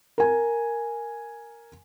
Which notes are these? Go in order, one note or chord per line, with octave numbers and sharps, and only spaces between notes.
A#4 G#5